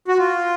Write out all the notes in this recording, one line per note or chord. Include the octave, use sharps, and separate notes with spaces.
F#4
F4